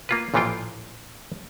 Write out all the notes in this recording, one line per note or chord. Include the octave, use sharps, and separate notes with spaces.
A#3 F4 B4
A1 A#2 E3 F3 F4 G5